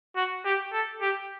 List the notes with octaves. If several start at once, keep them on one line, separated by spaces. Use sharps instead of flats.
F#4
G4
A4
G4